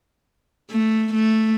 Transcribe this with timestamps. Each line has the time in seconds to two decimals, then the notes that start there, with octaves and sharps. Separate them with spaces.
0.70 A3
1.14 A3